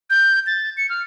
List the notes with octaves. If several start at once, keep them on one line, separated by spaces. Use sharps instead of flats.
G6
A6
C#7
F6